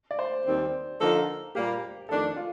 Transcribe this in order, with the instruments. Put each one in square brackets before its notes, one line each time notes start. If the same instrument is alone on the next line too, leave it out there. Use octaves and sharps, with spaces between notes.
[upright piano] D5
C5
[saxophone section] D#2 D#3 G3 C4
[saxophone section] D3 F3 A#3 D#4 A4 [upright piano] A#4
[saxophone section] A#2 G3 A#3 [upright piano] G4
[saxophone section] F2 D#3 A3 D4 [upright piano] A4
[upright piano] F4